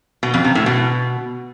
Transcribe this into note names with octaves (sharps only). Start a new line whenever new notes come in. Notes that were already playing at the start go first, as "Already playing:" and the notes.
B2
F2
C3
A2
B2